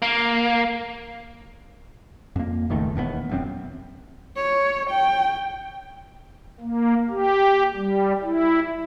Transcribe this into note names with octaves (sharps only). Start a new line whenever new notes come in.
A#3
F2 A#3
D#1 C#2 D#3 A3
E1 D#2 G#2 B3
E1 F#2 C4
C#5
G5
A#3
G4
G3
E4